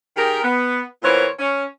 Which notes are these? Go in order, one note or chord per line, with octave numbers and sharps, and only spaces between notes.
D#3 G4 G#4 A#4
B3
A#2 E3 B3 A#4 C5 C#5
C#4